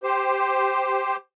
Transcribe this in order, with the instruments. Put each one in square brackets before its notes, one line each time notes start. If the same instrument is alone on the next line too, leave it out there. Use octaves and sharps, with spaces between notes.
[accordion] G4 C5